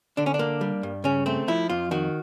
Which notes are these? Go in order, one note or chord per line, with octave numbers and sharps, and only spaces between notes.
D3 D4
C#4
D4
A#3
G3
G2
C#3 C#4
A3 C4
F3 E4
F2 F4
D#3 F#4